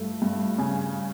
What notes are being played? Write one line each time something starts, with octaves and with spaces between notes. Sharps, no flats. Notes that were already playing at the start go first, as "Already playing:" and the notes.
Already playing: G2 A3
G2
C#3 G#5